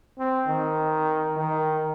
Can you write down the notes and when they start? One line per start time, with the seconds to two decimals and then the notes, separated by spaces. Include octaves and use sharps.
0.19 C4
0.48 D#3
1.37 D#3